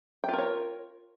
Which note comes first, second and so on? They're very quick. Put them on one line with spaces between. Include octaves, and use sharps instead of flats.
G5 F4 A#4 C#5